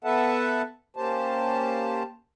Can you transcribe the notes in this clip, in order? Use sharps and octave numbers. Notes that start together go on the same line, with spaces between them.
B3 A4 B4 E5 F#5 A5
A#3 C#4 G4 C5 A5